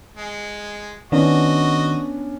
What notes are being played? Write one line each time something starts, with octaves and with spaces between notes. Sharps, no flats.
G#3
D#3 B3 C#4 D4 F#4 D#5